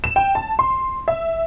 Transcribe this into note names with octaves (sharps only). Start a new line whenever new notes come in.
E7
G5
A5
C6
E5